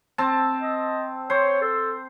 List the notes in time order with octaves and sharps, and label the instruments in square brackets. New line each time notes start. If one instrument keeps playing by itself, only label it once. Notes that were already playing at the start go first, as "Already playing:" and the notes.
[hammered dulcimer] C4 A5
[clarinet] D#5
[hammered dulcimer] C5 [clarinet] C#5
[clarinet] A4